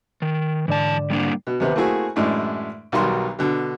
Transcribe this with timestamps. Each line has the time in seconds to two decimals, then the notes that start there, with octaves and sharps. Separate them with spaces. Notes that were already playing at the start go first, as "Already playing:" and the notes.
0.22 D#3
0.68 G#2 D3 E3 D5 A5
1.10 G3 A#3 D4
1.47 B2
1.60 D#2 C3 B3
1.76 A3 A#3 C4 E4 F#4 G#4
2.16 F#2 A2 E3 G#3 D4
2.92 B1 D#3 F#3 G3 F#4 C6
3.39 B2 D3